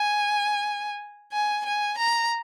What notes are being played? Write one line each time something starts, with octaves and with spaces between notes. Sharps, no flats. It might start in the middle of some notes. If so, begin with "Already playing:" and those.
Already playing: G#5
G#5
G#5
A#5